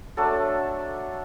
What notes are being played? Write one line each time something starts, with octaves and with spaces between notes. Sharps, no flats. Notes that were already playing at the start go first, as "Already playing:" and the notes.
F#3 A3 D4 A4